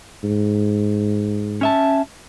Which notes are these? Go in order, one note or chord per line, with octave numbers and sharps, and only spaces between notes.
G#2
C#4 E5 A5